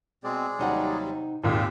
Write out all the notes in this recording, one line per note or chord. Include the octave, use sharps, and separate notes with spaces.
B2 G#3 C4 G#4 D5
D#2 C3 F#3 G3 D#4 F#5
G#1 D#2 A#2 G#3 G4 E6